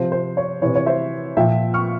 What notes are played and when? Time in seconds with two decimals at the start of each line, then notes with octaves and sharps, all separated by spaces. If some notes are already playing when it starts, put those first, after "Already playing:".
Already playing: C3 F3 C5
0.12 C5
0.37 C#5
0.62 C3 E3 C#5
0.76 C#5
0.86 C5 E5
1.37 A#2 F3 E5 G5
1.74 C#6 F6